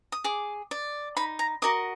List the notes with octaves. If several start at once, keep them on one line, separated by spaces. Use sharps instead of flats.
D#6
G#4 D6
D5
D#4 B5
A#5
F#4 A#4 D#5 D6